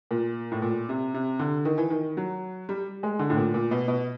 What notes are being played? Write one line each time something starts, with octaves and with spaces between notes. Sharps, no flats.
A#2
A2
A#2
C3
C3
D3
D#3
E3
D#3
F#3
G3
G#3
D3
A2
A#2
A#2
B2
B2